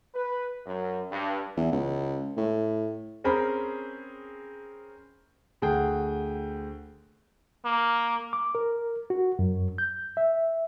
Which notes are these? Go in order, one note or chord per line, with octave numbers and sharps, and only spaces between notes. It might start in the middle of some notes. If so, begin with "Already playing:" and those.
B4
F#2
G2
E2
C#2
A2
C4 C#4 G#4 A#4 C5 B5
D2 G#4 F#5 G5
A#3
D6
A#4
F#4
F#2
G6
E5